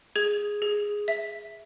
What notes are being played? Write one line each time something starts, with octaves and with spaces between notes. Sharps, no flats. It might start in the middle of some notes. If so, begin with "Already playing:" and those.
G#4 G#6
G#4
E5